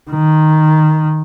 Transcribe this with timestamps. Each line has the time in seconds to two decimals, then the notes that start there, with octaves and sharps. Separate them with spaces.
0.11 D#3